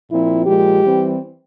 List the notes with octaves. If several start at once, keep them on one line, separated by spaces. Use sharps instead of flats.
A#2 F3 C4 E4
A#2 F3 G#3 G4
E3 G3 C4